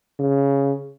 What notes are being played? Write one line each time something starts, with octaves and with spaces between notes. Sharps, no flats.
C#3